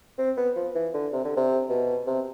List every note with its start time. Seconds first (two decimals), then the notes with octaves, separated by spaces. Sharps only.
0.18 C4
0.37 B3
0.56 F3
0.75 E3
0.94 D3
1.13 C3
1.25 D3
1.37 C3
1.69 B2
2.07 C3